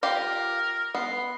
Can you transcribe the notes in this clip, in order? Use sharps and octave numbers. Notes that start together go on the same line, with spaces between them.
F4 G4 A#4 F5
B3 C6